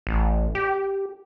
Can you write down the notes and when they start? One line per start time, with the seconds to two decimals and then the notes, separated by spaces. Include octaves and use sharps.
0.07 A1
0.55 G4